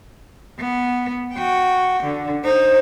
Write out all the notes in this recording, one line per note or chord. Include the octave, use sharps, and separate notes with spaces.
B3
F#4 G5
D3
D#4 C5